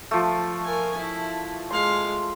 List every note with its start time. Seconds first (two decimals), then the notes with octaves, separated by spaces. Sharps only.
0.11 F3 A3
0.65 A#4 G#5
0.97 E4
1.70 G#3 F5 C6